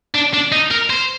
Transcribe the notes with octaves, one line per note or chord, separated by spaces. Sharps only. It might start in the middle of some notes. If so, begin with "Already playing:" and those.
D4
D4
D#4
A#4
C5